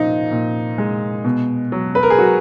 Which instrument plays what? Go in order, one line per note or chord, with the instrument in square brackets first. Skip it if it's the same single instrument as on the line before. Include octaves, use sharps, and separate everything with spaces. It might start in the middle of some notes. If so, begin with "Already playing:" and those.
Already playing: [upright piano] A#2 F3 D#4
A#2
G#3
B2
F#3
B4
A#4
G#4
F#3 F#4